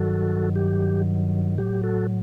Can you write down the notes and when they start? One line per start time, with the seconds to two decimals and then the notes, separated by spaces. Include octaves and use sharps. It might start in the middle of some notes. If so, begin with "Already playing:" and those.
Already playing: G2 D#3 F#3 F#4 A4
0.56 G4
1.58 A2 F#3 G4
1.83 F#4 A4